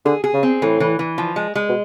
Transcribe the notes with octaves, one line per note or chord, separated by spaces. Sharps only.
D3 G#4
G#4
C#3
C4
A2 E3
E3
E3
F3
G#3
G#3
B2